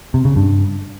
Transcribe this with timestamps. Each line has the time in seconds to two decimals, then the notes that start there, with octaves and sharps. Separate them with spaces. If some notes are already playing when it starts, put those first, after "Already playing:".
0.14 C3
0.25 C#3
0.36 G2